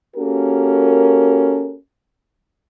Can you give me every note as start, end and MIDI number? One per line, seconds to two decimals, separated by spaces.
0.16 1.75 58
0.16 1.75 61
0.16 1.75 66
0.16 1.75 67
0.16 1.75 69
0.16 1.75 70